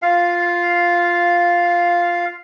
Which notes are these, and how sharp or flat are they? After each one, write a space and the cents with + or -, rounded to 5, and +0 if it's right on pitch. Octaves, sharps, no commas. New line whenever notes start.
F4 +0 F5 +0